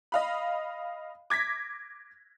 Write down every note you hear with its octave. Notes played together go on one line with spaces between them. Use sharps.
D#5 F5 B5
D6 G#6 A#6 B6